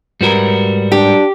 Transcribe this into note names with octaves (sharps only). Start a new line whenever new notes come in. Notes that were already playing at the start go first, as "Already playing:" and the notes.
G#2 G3 F#4 A#4 B4
D4 G4